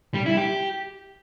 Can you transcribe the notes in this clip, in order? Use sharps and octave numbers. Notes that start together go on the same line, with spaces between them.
G3
E4
G4